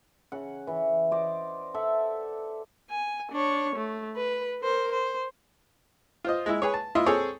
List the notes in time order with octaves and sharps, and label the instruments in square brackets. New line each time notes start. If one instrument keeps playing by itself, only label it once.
[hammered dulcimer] C#3 F#5
E3 F#5
C5 D5 D#5
A4 D5 E5 F#5
[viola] G#5
D4 C#5
A3
B4
A#4 C5
C5
[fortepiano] F4 C5 D#5
G#3 E4
G#4 B4 C#5
A5
E4 F4 D#5 C6
C4 G#4 A4 C#5